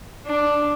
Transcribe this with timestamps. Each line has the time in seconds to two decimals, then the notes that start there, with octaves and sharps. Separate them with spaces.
0.26 D4